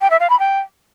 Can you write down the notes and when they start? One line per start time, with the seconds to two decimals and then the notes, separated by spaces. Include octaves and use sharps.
0.01 G5
0.10 E5
0.20 F5
0.30 B5
0.39 G5